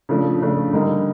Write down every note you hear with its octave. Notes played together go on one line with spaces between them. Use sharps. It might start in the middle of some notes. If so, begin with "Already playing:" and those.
C#3 F3 A3 D4
C#3 F3 A3 D4
D3 G3 A#3 D#4